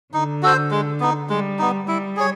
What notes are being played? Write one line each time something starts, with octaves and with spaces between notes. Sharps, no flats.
D3 D#4
F#4 A4 C5
G#3
B3 D#4
G3 G#3
B3 D#4
G3 E4
G#4 C#5